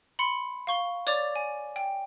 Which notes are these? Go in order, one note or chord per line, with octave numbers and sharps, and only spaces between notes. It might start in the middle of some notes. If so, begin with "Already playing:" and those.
B5 C6 C#7
F5 C#6 G7
C#5 D5 D6 A6 F7
G#5
G5